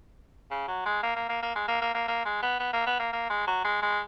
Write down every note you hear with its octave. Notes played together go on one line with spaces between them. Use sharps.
C#3
F#3
G#3
A#3
A#3
A#3
A#3
G#3
A#3
A#3
A#3
A#3
G#3
B3
B3
A#3
B3
A#3
A#3
G#3
F#3
G#3
G#3